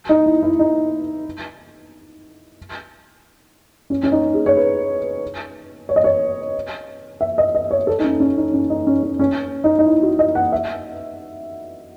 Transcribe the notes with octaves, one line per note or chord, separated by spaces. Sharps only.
D#4
E4
E4
D#4
C#4
C#4
D#4
G#4
C#5
B4
C#5
D#5
C#5
E5
D#5
D#5
C#5
A4
D#4
C#4
C#4
D#4
C#4
D#4
C#4
C#4
C#4
D#4
D#4
E4
F#4
D#5
F#5
E5